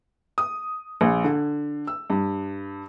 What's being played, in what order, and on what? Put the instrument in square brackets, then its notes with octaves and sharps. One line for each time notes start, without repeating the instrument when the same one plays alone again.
[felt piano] D#6
A#1
D3
E6
G2